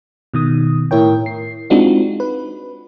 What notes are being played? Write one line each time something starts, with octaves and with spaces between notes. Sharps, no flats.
B2 D#3 D#6
A2 E4 A#4 C#5 G5
C7
G#3 C4 D4 D#4 F4 F#4
B4